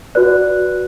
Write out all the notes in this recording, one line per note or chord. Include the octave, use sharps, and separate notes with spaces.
F#4 B4 D5 F#6